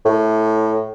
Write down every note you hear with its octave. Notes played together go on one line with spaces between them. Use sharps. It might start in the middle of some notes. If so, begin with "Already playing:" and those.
A2